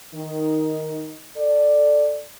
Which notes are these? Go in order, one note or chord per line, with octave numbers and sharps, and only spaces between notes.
D#3 D#4
A4 D5